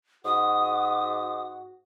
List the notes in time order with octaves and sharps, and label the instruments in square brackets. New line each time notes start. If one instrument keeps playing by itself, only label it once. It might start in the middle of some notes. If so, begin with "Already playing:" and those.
[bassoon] G#2 [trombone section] F#4 [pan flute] D#6